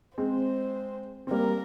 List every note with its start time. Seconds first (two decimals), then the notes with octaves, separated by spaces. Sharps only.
0.18 G#3 C4 C5
1.27 C4
1.31 G3 A#3 A#4